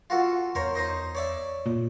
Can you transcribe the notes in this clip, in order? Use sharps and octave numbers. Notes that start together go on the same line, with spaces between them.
F4 F#4 A4
E2 A#4 C5 C#5
D#4 C5 D#5
C#5 D5 E5
A#2